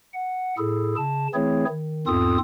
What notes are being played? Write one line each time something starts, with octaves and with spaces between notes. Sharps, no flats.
F#5
A2 E4 G#4 A4
C#3 A5
E3 A3 C4 E4 G#4 C#5
D#3
E2 G#2 C4 F4 A4 D#6